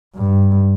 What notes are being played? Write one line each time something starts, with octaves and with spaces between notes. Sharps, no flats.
G2